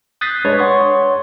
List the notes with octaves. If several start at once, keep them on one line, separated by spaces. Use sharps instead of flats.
D#6 F#6 G6 A6 B6 C7
G#3 D4 B4 C#5
C#5 F#5 C6 C#6 D#6